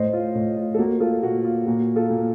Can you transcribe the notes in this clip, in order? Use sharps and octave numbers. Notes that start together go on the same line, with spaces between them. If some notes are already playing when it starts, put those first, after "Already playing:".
Already playing: A2 C5 D#5
F4
A2
F4
A4
A#3 F#4
F4 A4
A#2 F#4
F4
A#2 F#4
F4 A4
A#2